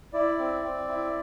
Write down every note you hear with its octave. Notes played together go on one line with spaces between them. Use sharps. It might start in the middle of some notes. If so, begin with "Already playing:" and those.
E4 D5
C4
C4
E4